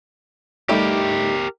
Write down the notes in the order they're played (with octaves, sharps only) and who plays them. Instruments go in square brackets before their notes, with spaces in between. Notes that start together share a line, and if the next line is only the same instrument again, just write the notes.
[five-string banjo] G3 A3 D#4 [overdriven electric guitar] G4 A#4